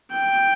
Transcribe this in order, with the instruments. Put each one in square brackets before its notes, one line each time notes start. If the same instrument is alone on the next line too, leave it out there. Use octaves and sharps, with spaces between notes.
[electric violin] G5